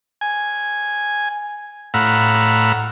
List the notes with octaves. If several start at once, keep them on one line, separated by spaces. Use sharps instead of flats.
G#5
A2 F5 F#5 A#5 B5 E6